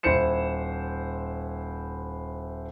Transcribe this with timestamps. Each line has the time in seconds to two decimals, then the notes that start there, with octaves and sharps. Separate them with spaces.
0.03 D#1 E4 C5 C#7 E7